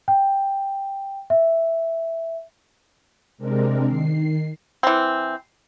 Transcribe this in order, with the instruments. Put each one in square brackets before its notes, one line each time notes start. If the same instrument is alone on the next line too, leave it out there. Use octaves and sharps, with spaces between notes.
[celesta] G5
E5
[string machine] C3 G#3 C4 D4 A#4
D#3 C7
[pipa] E3 C4